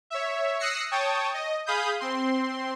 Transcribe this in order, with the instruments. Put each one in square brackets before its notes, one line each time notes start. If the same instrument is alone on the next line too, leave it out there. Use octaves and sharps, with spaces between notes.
[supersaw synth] C#5 E5
D#6 E6 F#6 A#6 C7 C#7
C#5 G5 A5 C#6 D#6
D#5
G#4 F5 B5 D#6 G6
C4 C6